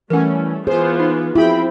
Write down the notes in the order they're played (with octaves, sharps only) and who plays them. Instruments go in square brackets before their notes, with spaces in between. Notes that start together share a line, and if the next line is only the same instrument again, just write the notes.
[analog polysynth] E3 C#4 [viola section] G3 A3 [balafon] A#4 F#5
[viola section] E3 B3 F4 [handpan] G#4 [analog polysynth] C5
[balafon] D#4
[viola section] F3 C4 [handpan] E4 [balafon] F#4 G#4 [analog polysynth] G5 B5